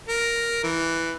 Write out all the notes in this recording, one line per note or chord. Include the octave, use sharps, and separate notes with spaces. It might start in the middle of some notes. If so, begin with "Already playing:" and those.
A#4
E3